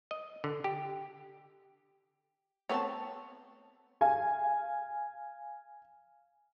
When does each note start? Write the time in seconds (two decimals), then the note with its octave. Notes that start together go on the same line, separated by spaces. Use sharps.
0.11 D#5
0.44 D3
0.64 G4
2.69 A3 B3 C4 C#5 A5
4.01 F5 G#5